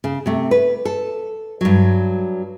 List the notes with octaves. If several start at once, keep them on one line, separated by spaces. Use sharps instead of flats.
C#3
C3 A3
B4
A4
G2 F#3